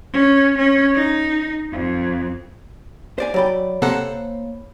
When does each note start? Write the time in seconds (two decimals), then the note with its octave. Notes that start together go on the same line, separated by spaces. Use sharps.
0.13 C#4
0.58 C#4
0.95 D#4
1.72 F2
3.18 C5 D5 G#5
3.34 F#3 C#5 D5 G5 B5
3.82 C3 A#3 A4 C5 F#5